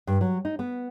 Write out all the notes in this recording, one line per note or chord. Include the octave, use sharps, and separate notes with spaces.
G2
F#3
D#4
B3